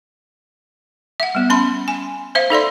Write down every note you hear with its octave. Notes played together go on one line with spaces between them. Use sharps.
E5 F#5
G3 B3
C#4 B5 C6
G#5
C5 E5 F5
D#4 A4 D5 C6